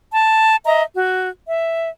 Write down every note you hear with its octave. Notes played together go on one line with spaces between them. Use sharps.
A5
D#5 E5 A#5
F#4
E5